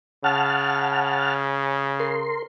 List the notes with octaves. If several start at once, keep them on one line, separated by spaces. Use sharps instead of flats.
C#3 F#5 A5 F6
A#4 C6